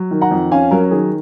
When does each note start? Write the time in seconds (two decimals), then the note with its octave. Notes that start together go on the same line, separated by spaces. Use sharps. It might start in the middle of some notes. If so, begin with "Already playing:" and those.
Already playing: F#3
0.11 D#3
0.22 F#5 A#5
0.31 F2
0.52 C#4 F5 G#5
0.71 F#3 A#4
0.84 A#4
0.91 D#3 G#4